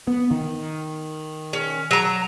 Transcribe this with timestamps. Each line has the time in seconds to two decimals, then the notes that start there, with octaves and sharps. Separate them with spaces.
0.07 B3
0.31 D#3
1.53 C#4
1.91 F#3 A#5